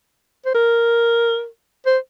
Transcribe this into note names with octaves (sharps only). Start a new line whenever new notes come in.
C5
A#4
C5